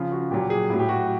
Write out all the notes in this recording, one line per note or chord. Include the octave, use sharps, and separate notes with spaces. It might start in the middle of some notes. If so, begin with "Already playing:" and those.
Already playing: C#3 F3 F4
F#4
A#2 F#3 G4
G#4
A2 F#3
G4
F#4